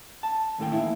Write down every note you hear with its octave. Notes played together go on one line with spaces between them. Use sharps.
A5
D#2 A2 A4 G5
E2 A#2 E3 E4